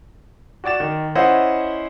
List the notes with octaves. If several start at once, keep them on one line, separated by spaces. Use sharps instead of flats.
F#4 D5 D6 A6 E7
D#3
C#4 E4 C5 D#5 E5 F#5